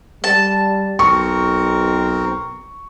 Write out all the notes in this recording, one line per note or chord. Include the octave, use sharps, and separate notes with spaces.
G3 A5
B1 C4 A#4 C#6